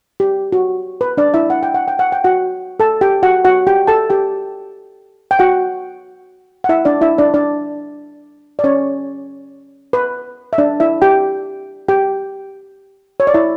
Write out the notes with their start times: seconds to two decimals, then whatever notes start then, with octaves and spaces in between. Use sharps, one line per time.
0.20 G4
0.53 F#4
1.01 B4
1.17 D4 D5
1.34 E4 E5
1.50 F#5
1.63 G5
1.74 F#5
1.88 G5
1.99 F#5
2.12 G5
2.24 F#4 F#5
2.80 A4 A5
3.01 G4 G5
3.23 F#4 F#5
3.45 F#4 F#5
3.67 G4 G5
3.87 A4 A5
4.10 G4 G5
5.31 G5
5.39 F#4 F#5
6.64 F#5
6.69 E4 E5
6.85 D4 D5
7.01 E4 E5
7.18 D4 D5
7.34 D4 D5
8.59 D5
8.64 C#4 C#5
9.93 B4
10.53 E5
10.58 D4 D5
10.80 E4 E5
11.02 G4 G5
11.88 G4 G5
13.20 C#5
13.27 D5
13.34 E4 E5